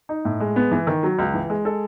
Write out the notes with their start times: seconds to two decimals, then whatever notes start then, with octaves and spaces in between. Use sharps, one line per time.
0.09 D#4
0.25 A2
0.40 G#3
0.56 B3
0.72 E3
0.87 D#3
1.03 F#3
1.19 C#2
1.34 E3
1.50 G#3
1.65 A4